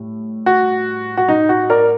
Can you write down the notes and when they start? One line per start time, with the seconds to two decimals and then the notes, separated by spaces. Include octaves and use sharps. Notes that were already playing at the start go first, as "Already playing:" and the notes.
Already playing: A2 G3
0.46 F#4
1.17 F#4
1.28 D#4
1.49 F#4
1.70 A#4 D5